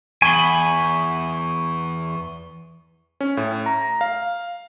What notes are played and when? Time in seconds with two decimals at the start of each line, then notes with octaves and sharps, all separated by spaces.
0.22 E2 G#5 B5 C#6 G7
3.21 C#4
3.37 A2
3.66 A#5
4.01 F5